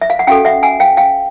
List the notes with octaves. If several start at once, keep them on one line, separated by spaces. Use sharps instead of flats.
E5
F5
F#5
C#4 F#4 A4 F5 G5
E5 F#5
F#5 G#5
F5 G5
F5 G5